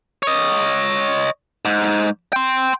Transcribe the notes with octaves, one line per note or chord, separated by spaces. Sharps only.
C#5 D#5
G#2
G5 C6